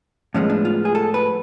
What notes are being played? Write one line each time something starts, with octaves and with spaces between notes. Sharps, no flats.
A2 F3 G#3 B3 C#4
D4
F4
G#4
A4
B4